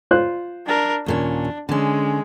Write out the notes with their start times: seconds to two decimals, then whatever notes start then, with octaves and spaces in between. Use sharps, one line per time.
0.11 F4 C5 F#6
0.66 D4 A#4
1.06 D#2 A#2 C#4 D4
1.69 D3 G#3 C#4